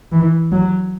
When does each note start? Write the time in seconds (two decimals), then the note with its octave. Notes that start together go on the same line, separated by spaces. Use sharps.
0.12 E3
0.52 F#3